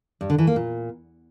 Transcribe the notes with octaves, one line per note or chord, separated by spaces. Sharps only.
G2
D3
E3
A#3
A#2